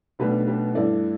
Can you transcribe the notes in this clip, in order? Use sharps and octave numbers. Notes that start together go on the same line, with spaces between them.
B1 B2 A3 D4 G4 B4
G4 B4
G2 E3 A3 E4 A4 D5